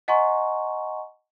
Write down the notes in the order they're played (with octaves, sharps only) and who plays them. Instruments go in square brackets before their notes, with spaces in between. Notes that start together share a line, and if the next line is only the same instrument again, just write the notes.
[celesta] D#5 F#5 G#5 A#5 C6 C#6